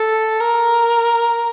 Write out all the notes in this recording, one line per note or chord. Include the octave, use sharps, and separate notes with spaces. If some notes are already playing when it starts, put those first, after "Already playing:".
Already playing: A4
A#4